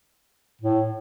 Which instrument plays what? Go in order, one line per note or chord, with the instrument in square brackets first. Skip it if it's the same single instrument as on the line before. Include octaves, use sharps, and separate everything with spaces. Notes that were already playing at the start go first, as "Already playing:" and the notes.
[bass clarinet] A2